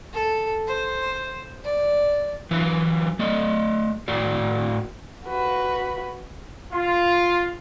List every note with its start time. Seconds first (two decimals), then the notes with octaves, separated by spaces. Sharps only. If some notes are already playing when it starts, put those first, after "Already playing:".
0.13 A4
0.67 C5
1.64 D5
2.51 E3 F#3 B4
3.19 A3 D5 D#5
4.08 A2 F#4 D5
5.26 F#4 B4
6.72 F4